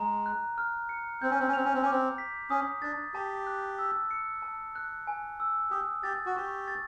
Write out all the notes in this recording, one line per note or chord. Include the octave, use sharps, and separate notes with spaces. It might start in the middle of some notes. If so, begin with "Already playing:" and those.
Already playing: G#3 A#5
F#6
F6
C#7
C4 G6
C#4
C4
C#4
C4 F7
C#4
C4
C#4
C4 D6
B6
C#4 D#6
D4 A6
G4 A5
F#6
E6
C#7
A5
F#6
G#5
E6
G4 D#6
G4 A6
F#4
G4 C#6
A6